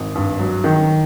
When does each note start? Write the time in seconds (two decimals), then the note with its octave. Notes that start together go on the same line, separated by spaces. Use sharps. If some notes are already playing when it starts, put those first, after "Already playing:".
Already playing: G#1
0.15 G2
0.39 F#3
0.64 D#3